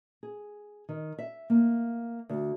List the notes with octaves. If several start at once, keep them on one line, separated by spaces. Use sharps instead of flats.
G#4
D#3
E5
A#3
D2